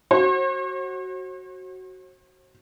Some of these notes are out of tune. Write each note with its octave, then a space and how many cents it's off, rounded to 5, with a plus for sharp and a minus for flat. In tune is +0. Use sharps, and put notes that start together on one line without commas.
F#4 +10 C5 +45